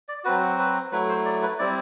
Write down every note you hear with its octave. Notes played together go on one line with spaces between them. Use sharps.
D5
F#3 C4 F#4 B4
B4
F#3 A3 E4 B4
C5
D5
B4
G3 C4 E4 D5